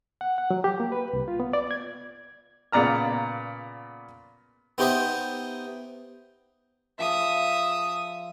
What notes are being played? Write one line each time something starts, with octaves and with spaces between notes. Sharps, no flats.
F#5
F#5
F#3
G4
A#3
B4
C2
F4
B3
D5
G#6
A#2 C#3 B3 D5 A#5 F6
B3 D#4 G4 C5 D#5 E5
F3 G#4 E5 D#6